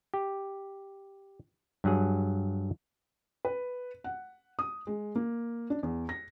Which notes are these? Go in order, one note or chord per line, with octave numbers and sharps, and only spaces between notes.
G4
G2 F#3 G#4
B4
F#5
D#6
G#3
A#3
D4
E2
A#6